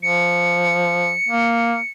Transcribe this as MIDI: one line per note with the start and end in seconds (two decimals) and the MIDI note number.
0.03 1.14 53
0.03 1.91 97
1.29 1.77 58